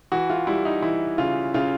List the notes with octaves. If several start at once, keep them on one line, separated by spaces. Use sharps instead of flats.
E3 F#4
F4
G3 E4
D#4
E3 E4
C#3 F4
C#3 F4